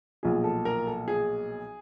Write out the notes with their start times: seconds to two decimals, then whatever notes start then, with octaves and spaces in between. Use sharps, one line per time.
0.23 B1 A#2 F3 G#4
0.44 A4
0.65 A#4
0.87 A4
1.08 G#4